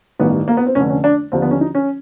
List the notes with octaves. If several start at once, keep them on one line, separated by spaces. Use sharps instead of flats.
A1 G2 D#3 B3
A#3
B3
C4
F1 F2 D3 C#4
C#4
D4
D#2 D3 F3 C4
B3
C#4
D#4
C#4